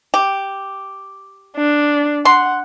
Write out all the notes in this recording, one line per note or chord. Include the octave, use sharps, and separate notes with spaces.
G4
D4
F#5 C6